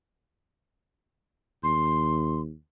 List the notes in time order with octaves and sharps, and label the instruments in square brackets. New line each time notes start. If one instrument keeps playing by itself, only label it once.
[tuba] D#2 [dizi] C6